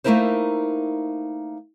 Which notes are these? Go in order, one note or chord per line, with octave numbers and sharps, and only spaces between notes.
A3 A#3 D#4 E4 A#4 C5